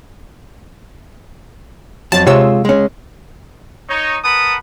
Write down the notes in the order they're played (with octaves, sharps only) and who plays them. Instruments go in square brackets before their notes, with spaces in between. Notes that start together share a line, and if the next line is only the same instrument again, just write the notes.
[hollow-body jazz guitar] F2 F#3 [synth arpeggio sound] A5
[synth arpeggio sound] C3 E6 [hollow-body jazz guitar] G#3 F4 C#5
[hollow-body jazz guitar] G#3 C#4
[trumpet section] D#4 C#5
A#4 B4 F#5 A5 B5 D#6